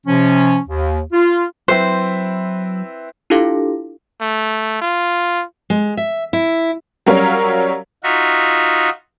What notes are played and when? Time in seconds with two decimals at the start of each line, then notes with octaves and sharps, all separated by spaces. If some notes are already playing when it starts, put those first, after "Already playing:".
0.06 C3 F3 C#4
0.68 D#2
1.13 F4
1.68 F#3 C4 E4 B4 C5
3.30 D4 E4 F4 G4 A4 F5
4.21 A3
4.81 F4
5.70 G#3
5.97 E5
6.33 E4
7.06 F#3 G3 C#4 A#4 C#5 F5
8.04 D#4 F4 F#4 E5